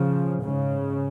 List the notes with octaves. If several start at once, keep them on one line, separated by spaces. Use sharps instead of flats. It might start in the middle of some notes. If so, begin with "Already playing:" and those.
Already playing: C#3 F3
G#2 C#3